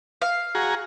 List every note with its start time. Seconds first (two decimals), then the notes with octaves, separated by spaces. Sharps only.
0.22 F5
0.55 F#4 G#4 A#5